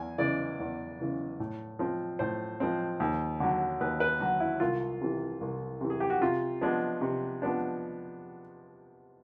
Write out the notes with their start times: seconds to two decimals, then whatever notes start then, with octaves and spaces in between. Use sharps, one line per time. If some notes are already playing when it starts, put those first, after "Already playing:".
Already playing: E2 G#5
0.18 C#3 E3 G#3 D5
0.60 E2
0.99 C#3 E3 G#3
1.40 A2
1.79 F3 G#3 C4
2.19 A2 C5
2.60 F3 G#3 C4
3.00 D#2
3.40 D3 F#3
3.80 D#2 B4
4.00 B4
4.20 D3 F#3 F#4
4.40 E4
4.60 C2 F4
5.01 C3 E3
5.41 C2
5.81 C3 E3
5.90 G#4
6.00 G4
6.10 F#4
6.21 C3 F4
6.61 F3 G#3 B3 D4
7.01 C3
7.42 F3 G#3 B3 D4